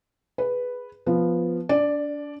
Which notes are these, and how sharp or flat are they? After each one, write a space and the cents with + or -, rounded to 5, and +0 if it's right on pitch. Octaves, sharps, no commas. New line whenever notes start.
G#4 +0 B4 +0
F3 +0 B3 +0
D4 -25 D5 +5